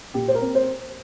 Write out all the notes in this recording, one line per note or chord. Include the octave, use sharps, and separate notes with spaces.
A#2 G4
C5
A#4
C4
C5